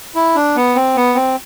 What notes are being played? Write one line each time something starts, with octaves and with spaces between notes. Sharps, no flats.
E4
D4
B3
C4
B3
C4